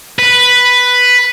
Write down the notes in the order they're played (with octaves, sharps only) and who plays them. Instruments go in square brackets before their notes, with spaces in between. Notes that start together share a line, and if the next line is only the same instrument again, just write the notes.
[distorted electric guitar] B4